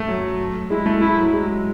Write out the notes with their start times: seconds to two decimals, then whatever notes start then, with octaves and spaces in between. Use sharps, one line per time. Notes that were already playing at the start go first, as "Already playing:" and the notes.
Already playing: A3
0.08 F#3
0.70 G#3 E4
0.86 A3
1.01 E4
1.18 F#3
1.33 G#3